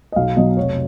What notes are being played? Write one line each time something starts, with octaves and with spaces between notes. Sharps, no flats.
D#5
B1 F5
B2 F#3 D#5
F1 C#5